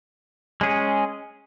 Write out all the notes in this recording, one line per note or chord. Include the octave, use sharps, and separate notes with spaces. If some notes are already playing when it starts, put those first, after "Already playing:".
G#3 C#4 G#4